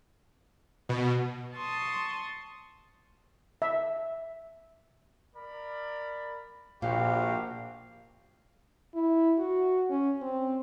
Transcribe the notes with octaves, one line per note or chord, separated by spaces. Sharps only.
B2
A5 C6 C#6 D#6
E5
A#4 D5 B5
A#1 A#2 F#4 G4 F5
E4
F#4
C#4
C4